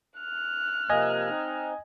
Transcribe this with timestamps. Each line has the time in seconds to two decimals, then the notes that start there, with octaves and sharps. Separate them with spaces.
0.20 F6 F#6
0.89 C3 F3 A#3 D#5 G#5 G#6
1.29 C4 D#4